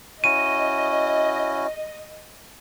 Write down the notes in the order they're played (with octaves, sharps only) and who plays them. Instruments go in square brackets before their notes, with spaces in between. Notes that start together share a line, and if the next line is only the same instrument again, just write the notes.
[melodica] C#4 E4 F#4 [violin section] D#5 [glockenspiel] D#7